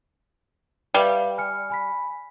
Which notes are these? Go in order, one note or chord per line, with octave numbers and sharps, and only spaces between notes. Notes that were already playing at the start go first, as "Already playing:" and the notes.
G3 B4 E5 F5
G#5 F6 C#7
G#5 B5 B6